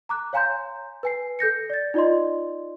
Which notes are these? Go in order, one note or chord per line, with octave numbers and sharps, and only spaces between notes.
A#5 D6 F#6
C#5 F5 G#5 A#5 C6 G6
B4 G#5 C7
A4 G6 A#6 C#7
D5 A6
D#4 F4 D5 D#5 C6